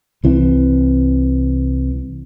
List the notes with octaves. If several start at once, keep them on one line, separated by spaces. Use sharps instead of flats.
C2 E3 C4